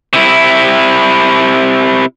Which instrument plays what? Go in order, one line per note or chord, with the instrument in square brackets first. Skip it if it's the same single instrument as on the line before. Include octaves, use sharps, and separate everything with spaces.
[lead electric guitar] C3 E4